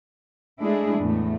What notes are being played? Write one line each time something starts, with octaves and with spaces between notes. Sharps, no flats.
G#3 A3 D4 E4 G#4
E2 A2 G#3 A3